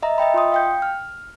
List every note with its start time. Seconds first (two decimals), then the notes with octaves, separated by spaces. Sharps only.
0.02 D#5 E5 A#5
0.18 D#5 E5 G5 B5
0.34 F4 C6 D#6
0.52 F5 G5 G6
0.82 F6